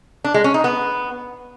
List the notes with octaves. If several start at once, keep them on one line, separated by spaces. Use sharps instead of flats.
D4
G#3
C#4
D#4
B3